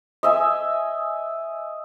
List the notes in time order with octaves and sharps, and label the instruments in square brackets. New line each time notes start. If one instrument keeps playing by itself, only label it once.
[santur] D#5 E5 G#5